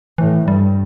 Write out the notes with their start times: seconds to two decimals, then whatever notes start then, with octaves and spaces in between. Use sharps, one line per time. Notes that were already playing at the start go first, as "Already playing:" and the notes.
0.18 A2 E3
0.48 G2 G3